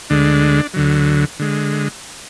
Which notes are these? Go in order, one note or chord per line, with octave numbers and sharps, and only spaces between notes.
D2 D3 G#3 D4
D2 D3 F#3
D3 G#3